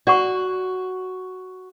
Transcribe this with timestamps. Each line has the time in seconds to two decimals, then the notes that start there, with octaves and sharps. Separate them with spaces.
0.07 F#4 D5 F#5 C#6